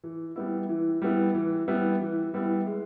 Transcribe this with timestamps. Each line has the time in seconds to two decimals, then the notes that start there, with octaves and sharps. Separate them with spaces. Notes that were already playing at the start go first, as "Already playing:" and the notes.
0.04 E3
0.36 G3 B3 E4
0.69 E3
1.02 G3 B3 E4
1.35 E3
1.68 G3 B3 E4
2.01 E3
2.34 G3 B3 E4
2.66 G#3